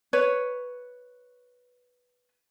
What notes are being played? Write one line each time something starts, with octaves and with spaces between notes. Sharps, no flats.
B4 C#5